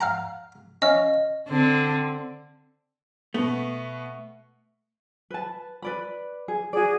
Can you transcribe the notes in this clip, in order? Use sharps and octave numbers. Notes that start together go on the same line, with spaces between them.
F5 F#5 A#5
C#4 D#5 F5
D3 C4
B2 A3 B3
B4 A5
B4 D5 B5
G#4
F#4 G#4 D5